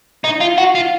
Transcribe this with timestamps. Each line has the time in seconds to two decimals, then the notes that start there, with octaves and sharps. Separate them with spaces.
0.25 D#4
0.41 F4
0.58 F#4
0.75 F4